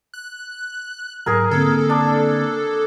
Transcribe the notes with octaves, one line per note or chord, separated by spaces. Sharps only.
F#6
G#2 F#3 G#4 A#4
D3 A#3 C4 A4
D4